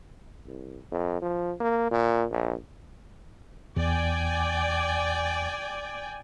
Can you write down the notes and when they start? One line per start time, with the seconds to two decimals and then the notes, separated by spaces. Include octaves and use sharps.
0.46 C2
0.91 F2
1.22 F3
1.60 A#3
1.91 A#2
2.31 A#1
3.77 E2 D5 G5 G#5